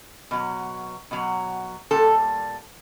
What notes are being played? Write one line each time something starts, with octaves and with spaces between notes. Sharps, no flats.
B2 F#3
B2 F#3
A#2 G3 A4